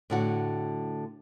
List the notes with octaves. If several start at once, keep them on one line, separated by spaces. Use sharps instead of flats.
A2 D3 F#4